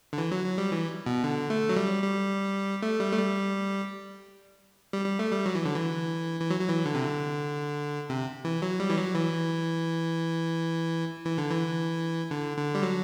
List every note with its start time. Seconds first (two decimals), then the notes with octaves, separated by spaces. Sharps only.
0.13 D3
0.18 E3
0.32 F#3
0.46 F#3
0.58 G3
0.72 E3
1.06 B2
1.24 D3
1.50 A3
1.69 F#3
1.76 G3
2.03 G3
2.82 A3
3.00 G3
3.12 A3
3.17 G3
4.93 G3
5.05 G3
5.19 A3
5.32 G3
5.46 F#3
5.55 E3
5.65 D3
5.75 E3
6.40 E3
6.50 F#3
6.60 F#3
6.69 E3
6.86 D3
6.95 C3
7.04 D3
8.09 C3
8.45 E3
8.62 F#3
8.80 G3
8.89 E3
8.97 F#3
9.14 E3
11.25 E3
11.38 D3
11.51 E3
12.31 D3
12.57 D3
12.75 G3
12.83 F#3